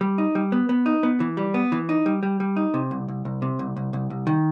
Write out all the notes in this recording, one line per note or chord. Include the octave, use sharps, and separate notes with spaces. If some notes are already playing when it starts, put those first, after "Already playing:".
G3
D#4
G3
B3
B3
D#4
B3
E3
G3
B3
E3
D#4
G3
G3
G3
D#4
C3
C2
C2
C2
C3
C2
C2
C2
C2
D#3